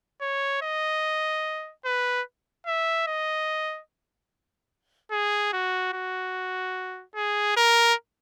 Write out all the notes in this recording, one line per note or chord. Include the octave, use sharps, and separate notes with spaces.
C#5
D#5
B4
E5
D#5
G#4
F#4
F#4
G#4
A#4